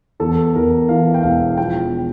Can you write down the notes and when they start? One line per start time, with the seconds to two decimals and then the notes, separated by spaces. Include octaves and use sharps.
0.20 E2 A4
0.55 E2 A#4
0.89 E3 F5
1.14 G5
1.23 E1 F5
1.58 F3 G5